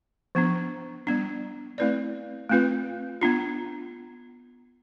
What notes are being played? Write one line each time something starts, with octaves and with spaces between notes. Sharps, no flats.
F3 B3 D4
G3 B3 D4
A3 C4 E4 B4 D5
A3 C4 F4 B4
B3 D4 F4